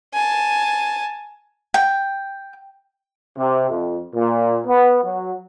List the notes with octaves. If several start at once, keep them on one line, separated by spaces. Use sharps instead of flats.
G#5 A5
G5
C3
F2
A#2
B3
F#3